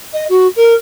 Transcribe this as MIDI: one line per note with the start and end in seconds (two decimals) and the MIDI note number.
0.13 0.24 75
0.28 0.47 66
0.55 0.73 70